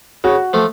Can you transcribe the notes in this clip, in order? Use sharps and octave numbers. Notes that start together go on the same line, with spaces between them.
C#3 F#4
F3 A3